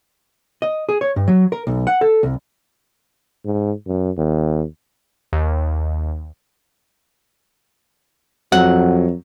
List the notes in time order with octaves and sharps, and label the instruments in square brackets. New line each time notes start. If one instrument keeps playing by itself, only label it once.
[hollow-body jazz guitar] D#5
G#4
C#5
G2
F#3
A#4
B1
F#5
A4
C2
[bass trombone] G#2
F#2
D#2
[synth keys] D#2
[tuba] F2 [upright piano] F#3 [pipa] F#5